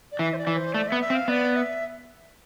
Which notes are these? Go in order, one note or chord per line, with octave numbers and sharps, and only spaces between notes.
D5
E3 E5
C5
D5
E3
C5
A3 D5
E5
B3
E5
C4
F5
B3 D5
E5